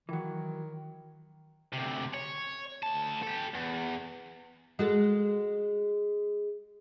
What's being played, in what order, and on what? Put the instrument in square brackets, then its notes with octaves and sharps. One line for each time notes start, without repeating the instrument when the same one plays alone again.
[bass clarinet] D#3 [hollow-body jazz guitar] E3 F#3
[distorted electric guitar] D2 C3
C#5
D2 A5
G4 A4
E2
[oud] G#3 F#4 A4